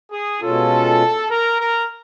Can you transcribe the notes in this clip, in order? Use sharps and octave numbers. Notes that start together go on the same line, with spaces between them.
G#4
B2 G#3 C#4 F4 A4
A#4
A#4